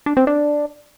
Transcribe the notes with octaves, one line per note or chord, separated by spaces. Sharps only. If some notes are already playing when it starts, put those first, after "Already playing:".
D4
C4
D4